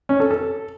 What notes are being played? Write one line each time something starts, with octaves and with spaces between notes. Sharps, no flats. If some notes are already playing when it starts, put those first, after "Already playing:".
C#4
A4
A4